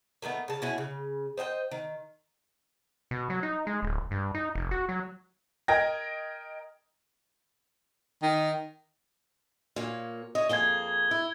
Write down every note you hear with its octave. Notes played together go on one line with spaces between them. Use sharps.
D3 D#3 A3 B3
C#3 A5
B2 C#4 E4 F#4
C#3
C5 D#5 F#5 G5
D#3
B2
F#3
D#4
G#3
D1
G2
D#4
F1
F#4
F#3
A#4 D#5 G5 G#6 A#6
D#3
A#2 A#3 C#5
C#5 D#5
F2 A#3 G#4 G#6 G7
E4